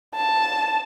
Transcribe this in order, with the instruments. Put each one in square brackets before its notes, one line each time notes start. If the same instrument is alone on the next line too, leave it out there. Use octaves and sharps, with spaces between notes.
[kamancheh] A5